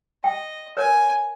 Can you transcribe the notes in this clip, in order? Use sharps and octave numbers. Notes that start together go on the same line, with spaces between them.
D#5 G5
A#4 B4 C#5 G#5